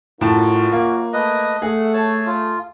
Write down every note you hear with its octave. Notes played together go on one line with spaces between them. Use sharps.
F#2 A2 F4 F#4 A5
A#3
A3 B4 D#5
A3 G#4 F#5
C#5 A5
F4